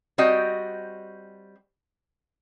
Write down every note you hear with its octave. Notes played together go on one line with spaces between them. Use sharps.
G3 C4 F#4 D#5 G5